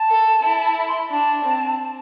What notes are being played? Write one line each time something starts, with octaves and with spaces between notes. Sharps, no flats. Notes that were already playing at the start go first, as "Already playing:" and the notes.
Already playing: A5
A4
E4
B5
C6
B5
D4 A5
C4